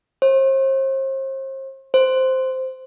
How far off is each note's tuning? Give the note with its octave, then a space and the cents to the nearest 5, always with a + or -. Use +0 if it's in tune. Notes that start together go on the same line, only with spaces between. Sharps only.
C5 +40
C5 -5